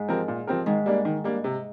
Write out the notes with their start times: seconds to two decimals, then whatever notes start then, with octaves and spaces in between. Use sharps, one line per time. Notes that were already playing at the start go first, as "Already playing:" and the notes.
Already playing: G#2 G#3
0.08 F3 C4 G4 A#4
0.28 A#2
0.47 F3 C4 G4 A#4
0.66 G#2 D#3 G#3
0.86 G3 A#3 D4
1.05 D#3
1.24 G3 A#3 D4
1.44 C3